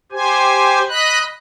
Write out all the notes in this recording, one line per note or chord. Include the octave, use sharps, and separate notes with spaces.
G4 C5 G#5
D#5 B5 F#6